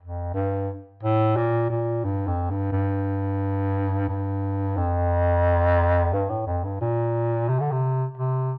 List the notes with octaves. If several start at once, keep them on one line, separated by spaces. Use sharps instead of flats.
F2
G2
A2
A#2
A#2
G2
F2
G2
G2
G2
F2
G2
A2
F2
G2
A#2
C3
D3
C3
C3